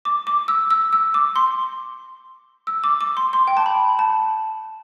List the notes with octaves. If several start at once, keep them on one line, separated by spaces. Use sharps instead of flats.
D6
D6
E6
E6
E6
D6
C6
E6
D6
D6
C6
C6
G5
A5
B5
A5